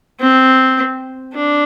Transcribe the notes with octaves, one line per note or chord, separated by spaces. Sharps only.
C4
D4